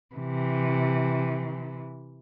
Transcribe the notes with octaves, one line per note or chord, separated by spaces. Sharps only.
C3 E3